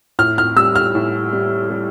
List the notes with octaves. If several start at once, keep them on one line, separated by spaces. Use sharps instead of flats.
A2 F6
F6
G3 E6
F6
A2
G3
G3